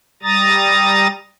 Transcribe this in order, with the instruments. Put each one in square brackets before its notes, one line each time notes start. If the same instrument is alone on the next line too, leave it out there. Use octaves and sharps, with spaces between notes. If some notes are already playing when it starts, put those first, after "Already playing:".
[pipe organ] G3 A#5 D#6 A6